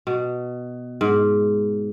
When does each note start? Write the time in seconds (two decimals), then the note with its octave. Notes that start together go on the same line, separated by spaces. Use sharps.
0.07 B2
1.01 G#2